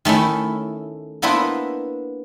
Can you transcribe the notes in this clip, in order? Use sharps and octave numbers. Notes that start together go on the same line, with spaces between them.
D#3 A3 C#4 E4
A#3 B3 D4 E4 B4 C5